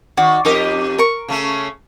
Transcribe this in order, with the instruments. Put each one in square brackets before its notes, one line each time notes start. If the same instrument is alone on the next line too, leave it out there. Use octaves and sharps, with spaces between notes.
[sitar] D#3 [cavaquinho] F#4 D5
[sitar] F2 G4 D#5 [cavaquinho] D#4 A#4 D6
[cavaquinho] A#4 C#6
[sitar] C#3 A3 C#4